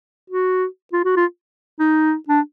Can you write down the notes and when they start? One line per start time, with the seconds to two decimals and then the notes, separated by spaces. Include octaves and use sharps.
0.30 F#4
0.93 F4
1.05 F#4
1.17 F4
1.80 D#4
2.29 D4